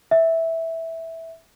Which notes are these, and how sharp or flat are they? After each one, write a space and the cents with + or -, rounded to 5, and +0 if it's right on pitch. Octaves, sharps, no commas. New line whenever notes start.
E5 -10